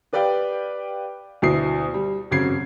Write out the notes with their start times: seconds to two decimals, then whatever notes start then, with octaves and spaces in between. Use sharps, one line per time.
0.13 G4 B4 D5 F5 G5
1.42 D2 B2 E4 D#6 C7
1.94 G3
2.31 G#1 F#2 C#3 G#6 C7